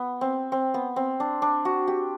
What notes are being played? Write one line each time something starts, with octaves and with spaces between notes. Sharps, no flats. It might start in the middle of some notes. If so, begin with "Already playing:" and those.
Already playing: B3
C4
C4
B3
C4
D4
D4
F#4
G4